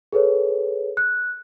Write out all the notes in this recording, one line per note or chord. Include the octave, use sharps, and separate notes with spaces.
G#4 A4 B4 C#5
F#6